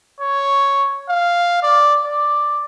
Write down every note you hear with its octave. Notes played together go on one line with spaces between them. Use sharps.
C#5
F5
D5
D5